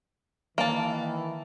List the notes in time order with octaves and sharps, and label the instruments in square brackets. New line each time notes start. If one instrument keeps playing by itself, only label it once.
[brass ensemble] D#3 E3 [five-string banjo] A#3 A5